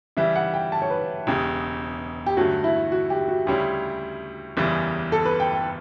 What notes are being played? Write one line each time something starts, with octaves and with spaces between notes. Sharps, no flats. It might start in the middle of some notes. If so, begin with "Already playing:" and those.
C#3 E3 G3 E5
F#5
G5
A5
C#5
B4
E1 E2 C#3 G4
G4
G2 D3 F#3 A3 C#4 F#4
E4
F#4
G4
F#4
D2 C#3 G3 C#4 E4 G4
F#1 E2 C#3 E3 G3
A4
B4
G5
G5